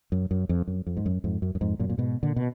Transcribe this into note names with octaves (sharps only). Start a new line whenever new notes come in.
F#2
F#2
F2
F#2
F2
G#2
F#2
F2 G#2
F#2
F#2
F2 G#2
F#2 A#2
A#2
G#2 B2
A#2 D3
B2